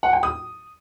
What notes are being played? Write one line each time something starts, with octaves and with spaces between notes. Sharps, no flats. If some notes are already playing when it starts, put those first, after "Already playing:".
F#5
G5
D#6